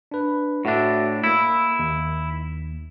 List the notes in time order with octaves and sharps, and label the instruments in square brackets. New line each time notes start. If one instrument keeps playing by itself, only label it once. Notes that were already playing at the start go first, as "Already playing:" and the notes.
[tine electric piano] D4 B4
[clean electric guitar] A2 D4 [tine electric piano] F#4 E5
[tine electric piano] A#3 E6 [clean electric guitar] E4
[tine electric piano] D#2